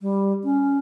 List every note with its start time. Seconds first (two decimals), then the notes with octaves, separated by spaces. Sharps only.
0.01 G3
0.44 C#4